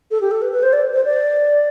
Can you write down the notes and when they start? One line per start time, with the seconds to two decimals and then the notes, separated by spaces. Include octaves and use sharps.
0.11 A4
0.21 G4
0.31 A4
0.42 B4
0.52 B4
0.63 C5
0.73 D5
0.94 C5
1.05 D5